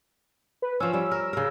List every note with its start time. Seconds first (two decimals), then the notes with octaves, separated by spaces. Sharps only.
0.62 B4
0.80 F3 C#4 E6
0.93 G3 C#4
1.11 A#4
1.33 C#3 A#4